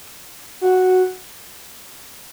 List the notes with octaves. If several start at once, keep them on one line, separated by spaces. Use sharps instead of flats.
F#4